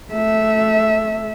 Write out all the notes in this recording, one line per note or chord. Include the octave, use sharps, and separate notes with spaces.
A3 E5